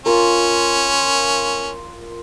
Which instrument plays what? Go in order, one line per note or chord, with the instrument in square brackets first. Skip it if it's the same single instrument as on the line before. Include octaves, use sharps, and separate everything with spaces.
[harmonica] C#4 [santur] F4 A#4